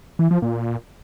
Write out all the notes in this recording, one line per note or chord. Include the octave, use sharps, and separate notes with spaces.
E3
F3
A#2